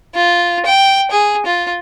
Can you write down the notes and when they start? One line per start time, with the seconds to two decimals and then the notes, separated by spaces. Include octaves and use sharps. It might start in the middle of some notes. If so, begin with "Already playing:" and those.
0.15 F4
0.66 G5
1.11 G#4
1.46 F4